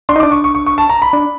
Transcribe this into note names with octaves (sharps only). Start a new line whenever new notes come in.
D4 C6
D#4
D4 D6
C#6
C#6
C#6
C#6
A5
A#5
B5
D4